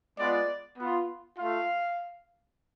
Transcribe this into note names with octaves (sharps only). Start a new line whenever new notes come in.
G#3 B3 F4 D5
B3 F4
A3 F4 F5